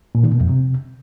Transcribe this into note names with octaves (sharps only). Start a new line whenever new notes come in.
A#2
D#3
B2
F2
C3